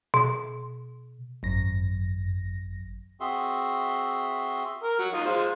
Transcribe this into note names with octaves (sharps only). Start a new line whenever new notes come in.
B2
G#1 F#2 A#6
C4 F#4 G#4 E5 C6
A#4
F#3
D#4 F4 D#5
G#3 F4 C5